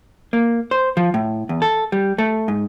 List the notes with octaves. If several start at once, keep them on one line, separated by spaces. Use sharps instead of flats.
A#3
C5
F3
A2
E2
A4
G3
A3
G#2